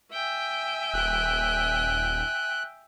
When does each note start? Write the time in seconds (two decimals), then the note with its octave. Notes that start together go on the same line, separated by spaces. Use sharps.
0.11 E5 G5 G#5
0.94 D#1 F#6